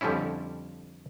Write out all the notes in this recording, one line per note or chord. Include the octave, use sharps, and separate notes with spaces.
F2 D3 F3 G3 C#4 E4